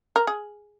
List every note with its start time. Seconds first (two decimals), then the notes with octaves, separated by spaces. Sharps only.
0.16 A#4
0.27 G#4